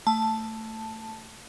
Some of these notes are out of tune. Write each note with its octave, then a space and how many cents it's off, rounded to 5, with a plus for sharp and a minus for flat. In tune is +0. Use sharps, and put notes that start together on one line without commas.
A3 +15 A5 +0